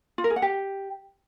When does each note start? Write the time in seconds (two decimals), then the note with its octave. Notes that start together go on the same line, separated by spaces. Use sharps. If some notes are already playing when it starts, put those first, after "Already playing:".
0.18 F4
0.24 A#4
0.30 G#4
0.36 F#5
0.42 G4